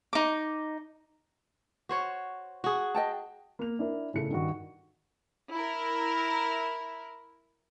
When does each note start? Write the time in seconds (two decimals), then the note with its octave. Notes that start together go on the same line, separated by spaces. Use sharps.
0.13 D#4 D6
1.89 F#4 C5 C#5
2.64 F#4 G#4
2.95 D#5 G5 A5
3.59 A#3 F7
3.79 D4 E4 A#4
4.14 A2 C#3 A4 C#7
4.31 G2 D#3 F#4
5.51 E4 A#4